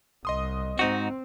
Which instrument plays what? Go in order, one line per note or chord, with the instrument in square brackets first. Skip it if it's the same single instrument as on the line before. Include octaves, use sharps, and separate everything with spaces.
[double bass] C2 [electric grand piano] D#5 C6 D#6
[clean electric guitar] G#2 D#4 F#4 [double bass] C4